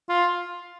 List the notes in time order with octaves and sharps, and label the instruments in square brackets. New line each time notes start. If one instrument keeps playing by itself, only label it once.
[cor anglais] F4